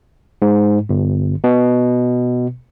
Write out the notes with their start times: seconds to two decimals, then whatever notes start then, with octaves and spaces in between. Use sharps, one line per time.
0.42 G#2
0.89 G1
1.44 B2